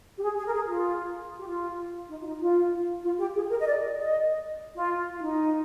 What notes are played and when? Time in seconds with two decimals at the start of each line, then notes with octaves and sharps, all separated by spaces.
0.17 G4
0.22 G#4
0.38 G#4
0.47 A#4
0.54 G#4
0.69 F4
1.39 G4
1.47 F4
2.10 D#4
2.21 F4
2.26 D#4
2.41 F4
3.03 F4
3.19 G4
3.34 G#4
3.49 A#4
3.59 D#5
3.66 D5
3.97 D#5
4.75 F4
5.18 F4
5.22 D#4